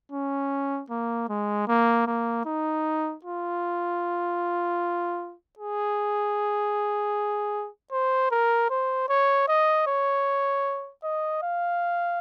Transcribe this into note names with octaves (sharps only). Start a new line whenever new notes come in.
C#4
A#3
G#3
A#3
A#3
D#4
F4
G#4
C5
A#4
C5
C#5
D#5
C#5
D#5
F5